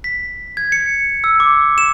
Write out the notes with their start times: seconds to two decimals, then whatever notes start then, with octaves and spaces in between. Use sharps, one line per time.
0.04 B6
0.57 G#6
0.72 C#7
1.24 E6
1.40 D6
1.78 E7